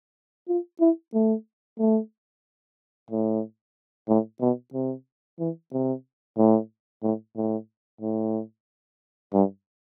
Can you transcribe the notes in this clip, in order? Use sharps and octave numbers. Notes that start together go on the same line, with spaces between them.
F4
E4
A3
A3
A2
A2
B2
C3
E3
C3
A2
A2
A2
A2
G2